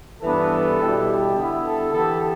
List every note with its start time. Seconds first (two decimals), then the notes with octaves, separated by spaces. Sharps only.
0.22 G2 E3 B3 D4 A4
0.80 B2 G3 E4 G4
1.36 D3 B3 E4
1.65 A4
1.93 E3 B3 G4 A4